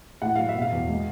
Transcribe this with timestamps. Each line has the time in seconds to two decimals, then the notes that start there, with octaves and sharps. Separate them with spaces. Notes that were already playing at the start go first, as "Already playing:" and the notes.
0.22 A2 F#5
0.36 F#3 F5
0.49 E5
0.55 B2
0.62 F5
0.72 E2
0.88 G#3